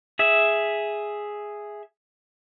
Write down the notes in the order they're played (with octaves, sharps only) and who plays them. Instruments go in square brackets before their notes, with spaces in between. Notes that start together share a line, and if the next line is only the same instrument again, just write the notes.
[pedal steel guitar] G#4 E5